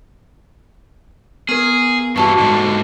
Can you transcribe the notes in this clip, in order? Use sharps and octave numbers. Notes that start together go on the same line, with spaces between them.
B3 G#4 A#4
G2 E3 F#4 A5 C#6
G#2 D3